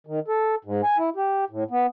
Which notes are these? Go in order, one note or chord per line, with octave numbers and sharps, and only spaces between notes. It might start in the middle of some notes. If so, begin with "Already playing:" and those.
D#3
A4
G#2
G#5
E4
G4
A2
B3